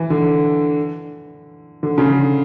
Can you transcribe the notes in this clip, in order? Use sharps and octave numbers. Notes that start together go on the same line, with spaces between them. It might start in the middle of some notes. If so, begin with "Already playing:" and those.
Already playing: E3
D3
D3
C#3
D3